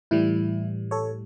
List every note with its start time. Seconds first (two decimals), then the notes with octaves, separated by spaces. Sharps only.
0.11 A2 E3 G3 E4
0.91 A4 C#5